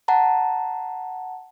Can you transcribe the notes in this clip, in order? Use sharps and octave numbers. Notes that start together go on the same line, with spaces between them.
F#5 A5 A#5